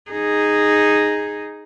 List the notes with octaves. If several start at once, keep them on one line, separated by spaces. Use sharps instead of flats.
D#4 G#4